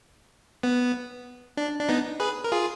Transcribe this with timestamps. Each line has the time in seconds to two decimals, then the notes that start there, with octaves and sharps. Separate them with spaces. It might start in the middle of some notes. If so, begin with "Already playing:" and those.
0.63 B3
1.57 D4
1.80 D4
1.89 B3 D#4
2.20 G#4 B4
2.44 A#4
2.51 F4 G#4